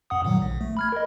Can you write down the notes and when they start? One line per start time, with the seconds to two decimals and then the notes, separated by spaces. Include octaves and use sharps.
0.10 F#2 F#5 D#6
0.25 A#2 D#3 F#3
0.42 A#1
0.61 A3
0.77 B5 F6 G#6
0.92 A#4 D#5